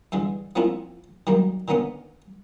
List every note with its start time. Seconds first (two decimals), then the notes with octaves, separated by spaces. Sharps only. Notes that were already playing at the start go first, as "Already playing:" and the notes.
0.12 G2 D3 E3 G#3
0.56 F3 A#3 C4 C#4 E4 F4
1.27 D#3 F#3 G3 A#3
1.68 D3 D#3 A#3 B3 C#4